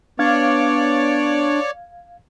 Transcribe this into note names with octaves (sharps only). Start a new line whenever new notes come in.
B3 D4 C#5 D5 F5 G#6